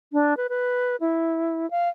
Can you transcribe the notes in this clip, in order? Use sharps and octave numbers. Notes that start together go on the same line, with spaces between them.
D4
B4
B4
E4
F5